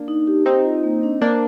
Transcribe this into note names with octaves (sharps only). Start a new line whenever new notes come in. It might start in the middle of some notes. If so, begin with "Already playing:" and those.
Already playing: A#3 D4
D#4
G4
C4 D#4 C5
F4
A#3
D4
A#3 D4 C5